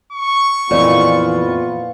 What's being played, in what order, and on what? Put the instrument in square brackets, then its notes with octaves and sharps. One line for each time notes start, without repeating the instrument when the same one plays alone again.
[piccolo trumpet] C#6
[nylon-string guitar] F2 E3 [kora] A#2 [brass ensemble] B3 F4